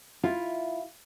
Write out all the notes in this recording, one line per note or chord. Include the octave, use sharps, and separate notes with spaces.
E4 F4